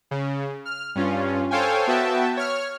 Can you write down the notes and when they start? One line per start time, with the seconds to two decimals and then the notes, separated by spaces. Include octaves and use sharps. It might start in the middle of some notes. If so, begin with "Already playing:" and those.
0.11 C#3
0.65 F6
0.95 G2 C#4 F4
1.51 A4 C5 C#5 F5 G5 G#5
1.87 B3 F#4 E5 G5 A5
2.37 C#5 F6